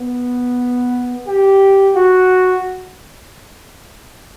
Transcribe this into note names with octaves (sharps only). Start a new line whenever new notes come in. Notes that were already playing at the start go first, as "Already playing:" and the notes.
Already playing: B3
G4
F#4